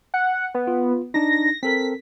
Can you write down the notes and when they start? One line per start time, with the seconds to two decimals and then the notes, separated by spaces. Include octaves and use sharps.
0.14 F#5
0.55 B3
0.67 F4
1.14 D4 D#4 A#6
1.63 C4 A4 A#4 B6